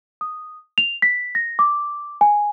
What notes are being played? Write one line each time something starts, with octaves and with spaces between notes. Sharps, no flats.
D#6
F7
B6
A#6
D6
G#5